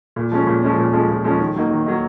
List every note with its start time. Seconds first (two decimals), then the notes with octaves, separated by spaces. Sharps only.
0.16 A#2
0.32 F3 G#3 C#4
0.47 A#2
0.63 F3 G#3 C#4
0.78 A#2
0.93 F3 G#3 C#4
1.09 A#2
1.24 F3 G#3 C#4
1.40 D#3
1.56 F#3 A#3 D#4
1.71 D#3
1.86 F#3 A#3 D#4